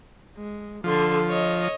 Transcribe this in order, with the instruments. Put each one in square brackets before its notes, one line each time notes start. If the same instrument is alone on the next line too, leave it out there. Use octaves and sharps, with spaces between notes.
[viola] G#3
[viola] D3 C6 [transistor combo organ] F3
[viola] C#5 D#5